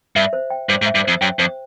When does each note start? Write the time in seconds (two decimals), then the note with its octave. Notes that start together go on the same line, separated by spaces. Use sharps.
0.16 G2 E5
0.33 C5
0.50 G5
0.69 G2 C5
0.82 G#2
0.86 E5
0.95 G2
1.04 F2 C5
1.21 F#2 G5
1.39 F2 C5